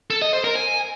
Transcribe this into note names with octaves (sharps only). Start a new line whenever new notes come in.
A4
D#5
C5
A#4
G#5